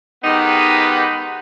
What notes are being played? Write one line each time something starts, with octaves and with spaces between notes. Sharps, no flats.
D#3 G#3 B3 D#4 G4 B4